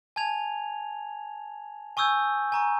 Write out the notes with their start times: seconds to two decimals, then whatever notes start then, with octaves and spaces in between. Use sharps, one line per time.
0.16 G#5 A5 G#6 F7
1.97 G#5 C#6 D#6 E6 G6 G#6
2.52 G#5 A#5 C#6